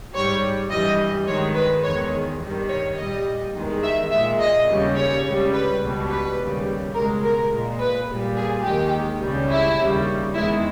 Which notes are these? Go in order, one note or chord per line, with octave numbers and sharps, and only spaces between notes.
G#2 G3 C#5
G2 E3 G3 D#5
G2 D#3 G#3 C#5
B4
E2 D#3 G#3 C#5
G2 D#3 G3
C#5
A#2 G3 D#5
E2 D#3 G#3
E5
A#2 G#3 E5
D#5
D#2 C#3 G3
C#5
C#2 C#3 G3
B4
C#2 B2 G3
B4
D#2 C#3 G3
C#2 B2 G#3 A#4
A#4
A#2 G#3
B4
A#2 G3
G#4
D#2 D#3 G#3 G4
C#2 C#3 G3
E4
D#2 C#3 G3
E2 D#3 G#3 E4